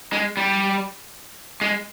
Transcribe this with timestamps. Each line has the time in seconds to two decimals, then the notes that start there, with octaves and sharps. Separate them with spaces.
0.13 G#3
0.37 G3
1.61 G#3